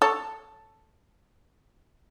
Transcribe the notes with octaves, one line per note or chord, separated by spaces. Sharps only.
A4 C#5